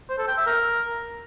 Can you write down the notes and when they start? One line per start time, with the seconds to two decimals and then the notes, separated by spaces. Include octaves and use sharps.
0.09 C5
0.18 A4
0.28 G5
0.37 E5
0.46 A#4